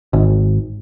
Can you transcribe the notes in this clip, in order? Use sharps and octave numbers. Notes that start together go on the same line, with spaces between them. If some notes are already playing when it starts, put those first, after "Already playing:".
G#1